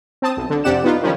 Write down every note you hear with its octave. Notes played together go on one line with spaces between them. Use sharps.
C4 A5 D#6
B1
D3
F2 C3 G4 D5 F#5 E7
B3 D#4 F4
D#3 F3 G3 C#4